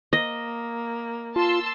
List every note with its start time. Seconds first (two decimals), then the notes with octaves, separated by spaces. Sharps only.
0.13 A#3 D#5
1.36 F4 A5 C6 E6